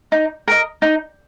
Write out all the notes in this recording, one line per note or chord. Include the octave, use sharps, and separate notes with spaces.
D#4
A#4 D#5
D#4